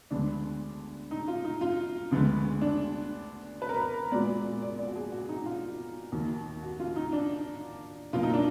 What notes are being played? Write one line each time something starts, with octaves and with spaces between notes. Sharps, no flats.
D2 D3 G#3 B3 D4
D#4
F4
D#4
F4
D2 D3 G#3 B3
D4
B4
A#4
B4
A#2 G#3 B3 D5
D5
D5
F#4
G#4
F#4
D#4
F4
D#2 D#3 A#3
F#4
F4
D#4
D4
B2 F#3 A#3 F4
D#4
D4